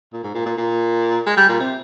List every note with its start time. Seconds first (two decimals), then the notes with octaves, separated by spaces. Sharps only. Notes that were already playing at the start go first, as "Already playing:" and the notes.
0.13 A#2
0.23 G#2
0.35 A#2
0.46 A#2
0.57 A#2
1.26 G#3
1.37 G3
1.49 A#2
1.60 C3